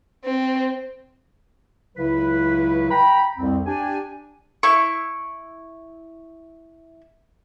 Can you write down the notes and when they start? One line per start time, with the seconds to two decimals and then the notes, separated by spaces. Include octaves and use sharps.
0.25 C4
1.96 C#2 C#3 F#3 E4 B4
2.90 G5 A#5 B5
3.38 C2 F2 C4
3.66 D4 G4 G#5
4.63 E4 C#6